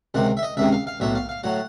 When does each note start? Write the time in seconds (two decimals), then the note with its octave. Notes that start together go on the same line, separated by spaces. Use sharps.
0.14 C#2 C3 D#3 F#5
0.37 E5
0.43 D#5
0.57 C#2 C3 D#3 E5
0.72 F5
0.87 F5
1.00 B1 A2 F#3 E5
1.15 F5
1.29 F5
1.43 A2 F#3 F#5